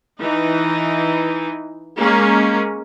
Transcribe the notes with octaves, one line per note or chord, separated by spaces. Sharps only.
E3 D#4
G#3 A#3 C#4